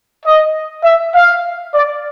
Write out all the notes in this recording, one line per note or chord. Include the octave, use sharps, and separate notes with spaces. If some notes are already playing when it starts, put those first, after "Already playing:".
D#5
E5
F5
D5